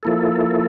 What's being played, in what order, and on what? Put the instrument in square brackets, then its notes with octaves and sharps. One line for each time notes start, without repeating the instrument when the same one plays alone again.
[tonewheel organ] F3 A#3 E4 A4